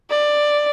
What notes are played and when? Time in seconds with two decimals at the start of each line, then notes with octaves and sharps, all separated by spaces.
0.10 D5